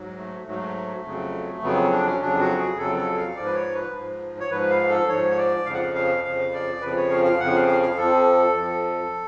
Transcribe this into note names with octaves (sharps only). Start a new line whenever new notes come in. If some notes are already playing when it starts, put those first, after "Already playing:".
Already playing: G#2 F#3
A3
G#2 F#3 A3
F2 C#3 F#3
F2 C#3 F#3 B3
D4
C#4
F2 C#3 F#3 D4
F#4
G#4
F2 C#3 F#3 A4
A4
F5
G#2 F3 D5
B4
C#5
B4
G#2 F3
C#5
G#2 F3 B4
F5
A4
G#2 F3 C#5
C#5
D5
F2 C#3 F3 F5
F#5
F5
F5
F2 C#3 F3 F5
D5
F2 C#3 F3 B4
C#5
F5
F5
F2 C#3 F3 F#5
F5
F5
F5
F2 F3 A4
F2 F3